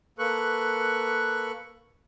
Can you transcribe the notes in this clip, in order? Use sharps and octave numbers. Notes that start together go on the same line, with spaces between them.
A#3 A4 B4 C#6 F#6